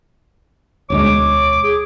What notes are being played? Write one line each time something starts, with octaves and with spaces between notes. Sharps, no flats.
E1 D2 G#3 C#5 D6
G#4